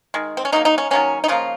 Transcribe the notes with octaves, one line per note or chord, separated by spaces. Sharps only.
D#3 G#3
C4
C#4
C#3 F#3 A#3 D#4
D#4
C#4
D#3 F#3 A#3 C#4
D#4
C#3 F3 A#3 F4